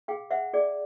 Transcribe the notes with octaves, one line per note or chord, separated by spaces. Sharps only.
G#4 F5 G5
C5 E5 F#5
G#4 D5